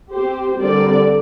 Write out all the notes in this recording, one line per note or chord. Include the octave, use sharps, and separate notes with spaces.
C4 G4 C5
D3 G3 C4 A#4 D5